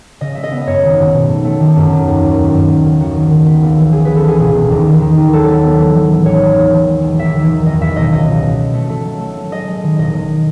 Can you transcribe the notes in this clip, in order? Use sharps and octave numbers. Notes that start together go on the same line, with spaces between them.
C#3 D#5
G#3 E5
D#5
B3
D#5
F#2 C#5
G#1
G#1
B2
A3
A3
D#3
F#2
D#3
D#2
D#2
D#2
F#2
F#2
F#1
D#3 F#4
G#1
D#3
B3
C#2
E3
E3 G#4
E3 B4
A4
E3 G#4
E1
E1
D#2
D#3
D#3
D#2
F#3 A4
B3
B3
E3
E3
A1
D#2 C#5
A3
D#2
E3
G#3
B1
D#2 E5
D#3
D#3
E2 D#5
E2 E5
E1 D#5
C#2 D#5
B2
B2
A3
A3
A3
F#3
A3
A3
G#3 D#5
G#3
D#3
E1 D#5
E1